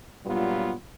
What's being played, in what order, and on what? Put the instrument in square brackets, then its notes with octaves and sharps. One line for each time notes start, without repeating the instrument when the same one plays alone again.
[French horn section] G2 A#2 F#3 G3 B3 F4